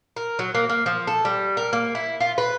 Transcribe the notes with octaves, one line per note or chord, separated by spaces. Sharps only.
A#4
F#3
A#3
A#3
F3
A4
G3
A#4
A#3
E4
F4
B4